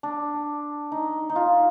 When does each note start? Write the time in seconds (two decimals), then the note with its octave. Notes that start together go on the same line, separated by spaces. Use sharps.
0.03 D4
0.92 D#4
1.29 D#4
1.36 F4